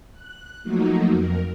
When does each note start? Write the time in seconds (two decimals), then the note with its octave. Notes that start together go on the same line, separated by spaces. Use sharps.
0.13 F#6
0.64 F3 F#3 A3 A#3 D#4 F#4
1.09 F2 A#4